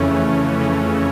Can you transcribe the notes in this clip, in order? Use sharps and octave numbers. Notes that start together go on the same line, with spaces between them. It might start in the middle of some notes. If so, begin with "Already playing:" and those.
Already playing: F2 C#3 E3 A3 C#4
F2
C#3 E3 A3 C#4